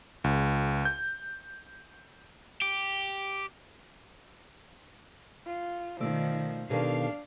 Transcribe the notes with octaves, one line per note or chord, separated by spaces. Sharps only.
C#2
G6
G4
F4
B2 D#3 F3 A3 D5 E6
B2 D#3 D4 G4 A4 A#4 F5